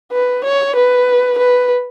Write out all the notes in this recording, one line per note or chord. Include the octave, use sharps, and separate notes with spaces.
B4
C#5
B4
B4